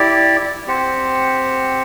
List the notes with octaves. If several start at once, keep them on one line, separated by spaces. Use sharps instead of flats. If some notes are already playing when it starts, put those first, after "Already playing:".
Already playing: E4 G4 D5
C4 G4 C5 F#5